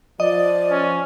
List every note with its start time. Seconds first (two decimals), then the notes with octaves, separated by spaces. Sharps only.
0.20 F3 D5 D#5
0.70 C#4